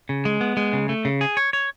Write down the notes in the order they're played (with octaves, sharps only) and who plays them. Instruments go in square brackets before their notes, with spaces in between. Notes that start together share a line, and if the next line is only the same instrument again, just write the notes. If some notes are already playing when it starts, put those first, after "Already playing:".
[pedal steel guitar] C#3
G#3
B3
G#3
C#3
A3
C#3
G#4
C#5
C#5